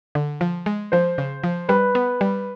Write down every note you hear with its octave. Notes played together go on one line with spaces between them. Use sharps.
D3
F3
G#3
F3 C5
C#3
F3
G3 B4
B3
G3